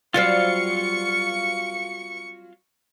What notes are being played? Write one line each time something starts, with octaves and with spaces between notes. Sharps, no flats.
F#3 G3 C4 F4 F5 C#6 C#7